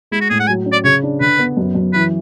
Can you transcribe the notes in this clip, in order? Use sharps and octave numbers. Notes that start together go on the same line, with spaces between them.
G#3 E4
F#4
A2 G#4
F#5
F#3 G#5
C#4
D5
C#3 C#5
D4
D3 B4
B3
F#2
F#2
E3 B4